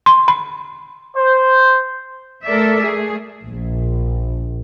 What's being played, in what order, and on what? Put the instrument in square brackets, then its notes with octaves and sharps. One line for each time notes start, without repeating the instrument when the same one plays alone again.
[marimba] C6
B5
[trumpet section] C5
[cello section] A3 A4 A#4 D5 E5
A3 G#4
[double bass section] A#1